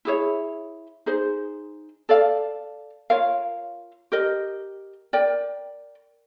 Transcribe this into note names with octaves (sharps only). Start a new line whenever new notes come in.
E4 G#4 C#5 E5
D#4 G#4 C5
A4 D5 F5
F4 A#4 C#5 F5
G4 A#4 D#5
A#4 D5 G5